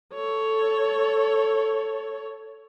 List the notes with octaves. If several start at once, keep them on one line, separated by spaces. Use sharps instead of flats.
A4 C#5